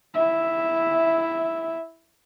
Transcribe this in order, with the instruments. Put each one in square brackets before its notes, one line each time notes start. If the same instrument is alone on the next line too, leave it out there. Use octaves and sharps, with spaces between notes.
[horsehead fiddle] E4 E5